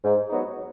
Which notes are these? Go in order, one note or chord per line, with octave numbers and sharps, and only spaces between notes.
G#2
F#3 B3 D#4